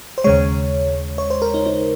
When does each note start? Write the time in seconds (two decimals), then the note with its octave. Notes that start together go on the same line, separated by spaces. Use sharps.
0.18 C5
0.24 D#2 C#3 G#3 C#5
1.18 C#5
1.30 C5
1.42 A#4
1.54 D#4
1.66 D#4